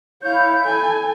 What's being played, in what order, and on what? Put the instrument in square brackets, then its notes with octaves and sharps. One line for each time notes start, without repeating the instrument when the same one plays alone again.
[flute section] E4 G6 [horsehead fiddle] C#5 F5
[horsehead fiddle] A4 G#5